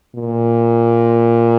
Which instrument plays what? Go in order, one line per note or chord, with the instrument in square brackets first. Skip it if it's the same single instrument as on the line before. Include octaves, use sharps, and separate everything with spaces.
[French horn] A#2